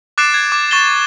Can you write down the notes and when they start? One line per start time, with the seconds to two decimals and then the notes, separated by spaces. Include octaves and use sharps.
0.18 D6 F#6 A6 C7 D7 E7
0.34 G#6
0.52 D6
0.71 C#6 A6 E7 G7